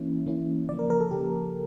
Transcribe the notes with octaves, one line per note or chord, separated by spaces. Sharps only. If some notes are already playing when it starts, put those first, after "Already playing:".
Already playing: E3 A#3 C#4 E4
E3 A#3 C#4 E4
C#3 F3 A#3 D5
A#4
A#4
A4
C#3 F3 A#3 G4